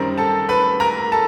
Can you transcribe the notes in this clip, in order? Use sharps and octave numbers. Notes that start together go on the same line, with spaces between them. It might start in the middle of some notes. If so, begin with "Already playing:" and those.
Already playing: F#2 D#3 G3 C4 A#4 A#5
A4 A5
B4 B5
A#4 A#5
A4 A5